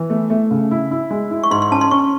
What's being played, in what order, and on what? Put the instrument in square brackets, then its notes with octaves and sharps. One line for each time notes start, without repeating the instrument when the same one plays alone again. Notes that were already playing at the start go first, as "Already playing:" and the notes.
Already playing: [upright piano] E3
A3
A3
C#3
E4
E4
G#3
E4
[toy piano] C#6
[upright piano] G#2 [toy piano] C6
[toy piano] C6
[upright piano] C#4 [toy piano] A5
[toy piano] C6
[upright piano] C#4 [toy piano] C#6